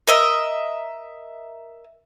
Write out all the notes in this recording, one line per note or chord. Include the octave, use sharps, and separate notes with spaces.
A#4 D#5 E5